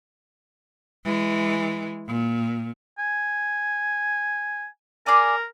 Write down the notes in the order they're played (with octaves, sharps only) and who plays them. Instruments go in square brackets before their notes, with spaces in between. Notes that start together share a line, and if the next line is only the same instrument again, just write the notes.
[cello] E3 G#3
A#2
[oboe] G#5
[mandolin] G#4 D5 G#5 [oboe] A#4